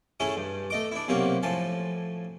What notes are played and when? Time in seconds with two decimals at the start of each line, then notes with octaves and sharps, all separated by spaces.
0.20 A3 C#4 E4 G#4 A4
0.37 G2
0.70 A3 D#5 D6
0.91 D4 E4
1.08 B1 C3 A#3 C#4 F#4
1.43 A2 F3 G#5 A5